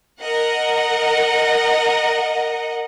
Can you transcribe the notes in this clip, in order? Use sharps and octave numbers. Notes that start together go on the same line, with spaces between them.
A#4 D#5 F#5